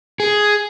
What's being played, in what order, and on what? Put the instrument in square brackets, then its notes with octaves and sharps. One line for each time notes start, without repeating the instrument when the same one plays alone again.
[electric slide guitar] G#4